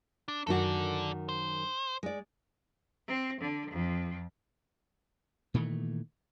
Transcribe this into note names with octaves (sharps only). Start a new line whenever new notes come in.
D4
F#2 D#3 F#4 A4 D5
C5
G#3 D5
C4
D3
F2
A#2 D#3 E3 A3